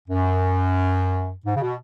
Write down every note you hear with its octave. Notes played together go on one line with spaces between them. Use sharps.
F#2
G#2
C#3
B2